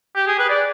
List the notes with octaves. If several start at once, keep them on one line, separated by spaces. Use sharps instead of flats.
G4
G#4
B4
D5